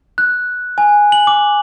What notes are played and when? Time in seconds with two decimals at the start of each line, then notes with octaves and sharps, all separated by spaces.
0.18 F#6
0.78 G#5
1.12 F#7
1.27 D6